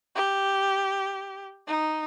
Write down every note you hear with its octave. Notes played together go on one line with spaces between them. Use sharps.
G4
D#4